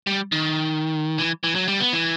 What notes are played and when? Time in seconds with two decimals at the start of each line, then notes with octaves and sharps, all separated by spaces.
0.07 G3
0.32 D#3
1.18 E3
1.44 E3
1.55 F#3
1.68 G3
1.80 B3
1.93 E3